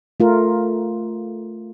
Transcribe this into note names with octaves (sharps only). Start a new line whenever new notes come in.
A3 F4 A#4